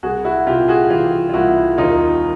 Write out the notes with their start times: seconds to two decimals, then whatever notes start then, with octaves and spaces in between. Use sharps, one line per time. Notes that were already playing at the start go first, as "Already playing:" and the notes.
0.03 C2 F#4 G#4
0.25 E4 F#4
0.47 C3 F4 G4
0.68 F#4 G#4
0.90 E3 F4 G4
1.29 F4
1.34 C2 E4 F#4
1.78 D#2 D#4 F4